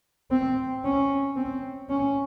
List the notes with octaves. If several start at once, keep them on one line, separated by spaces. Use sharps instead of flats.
C4
C#4
C4
C#4